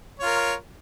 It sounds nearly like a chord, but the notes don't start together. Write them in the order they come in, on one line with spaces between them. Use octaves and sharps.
C#5 F4 A#4